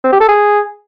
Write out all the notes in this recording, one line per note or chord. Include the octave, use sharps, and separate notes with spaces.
C4
G4
A4
G#4